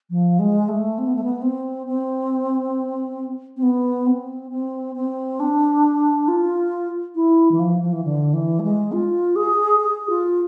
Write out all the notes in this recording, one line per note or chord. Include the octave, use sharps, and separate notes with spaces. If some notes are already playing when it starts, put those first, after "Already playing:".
F3
G#3
A3
C4
B3
A3
B3
C4
C4
C4
B3
C4
C4
C4
D4
F4
E4
E3
F3
F3
E3
D3
E3
A3
G#3
F4
G#4
G#4
F4